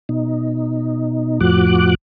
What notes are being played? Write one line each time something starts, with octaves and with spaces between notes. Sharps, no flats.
B2 D#4
F2 A2 F3 F#4 D6 F#6